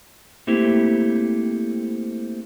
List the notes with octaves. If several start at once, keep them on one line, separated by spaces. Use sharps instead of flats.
A3 A#3 C4 E4 G4